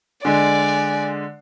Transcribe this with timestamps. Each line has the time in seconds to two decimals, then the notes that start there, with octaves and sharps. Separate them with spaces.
0.25 D3 G#3 D5 G#5